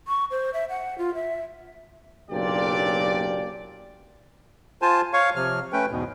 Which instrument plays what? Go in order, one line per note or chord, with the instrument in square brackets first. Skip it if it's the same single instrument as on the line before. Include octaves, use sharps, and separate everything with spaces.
[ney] C#6
C5
E5
F#5
F4
E5
[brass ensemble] F#1 B1 A#2 D4 G4 D5
[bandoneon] F4 C5 G#5 A5
C#5 F5 C#6
C3 F3 F6
A3 C#4 B4 G5
E2 G#2 B2